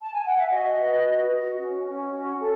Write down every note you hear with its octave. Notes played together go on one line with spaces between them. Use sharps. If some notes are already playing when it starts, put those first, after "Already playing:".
A5
G#5
F#5
E5
F#4 D#5
B4
F#4
F#4
C#4
C#4
F#4
A4